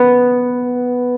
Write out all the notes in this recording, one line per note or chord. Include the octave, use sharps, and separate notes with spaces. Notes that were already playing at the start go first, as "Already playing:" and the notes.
Already playing: B3